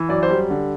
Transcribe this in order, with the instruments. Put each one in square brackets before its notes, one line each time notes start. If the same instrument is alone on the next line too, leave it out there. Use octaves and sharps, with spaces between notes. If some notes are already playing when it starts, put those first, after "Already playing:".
Already playing: [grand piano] E3
F#2 D5
C5
G3
D3